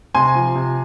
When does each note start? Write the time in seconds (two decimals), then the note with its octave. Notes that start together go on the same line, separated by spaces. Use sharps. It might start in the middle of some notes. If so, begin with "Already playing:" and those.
0.15 C3 G#5 C6
0.35 F3
0.55 C3